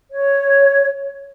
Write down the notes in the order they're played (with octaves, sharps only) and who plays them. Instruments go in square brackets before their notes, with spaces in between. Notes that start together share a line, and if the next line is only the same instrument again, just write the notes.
[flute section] C#5